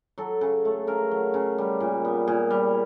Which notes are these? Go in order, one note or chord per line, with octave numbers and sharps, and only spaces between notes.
F#3 A4
C#3
A3
C#3 A#4
F#3
C#3
G3
A#2
B3
A#2 G#4
G3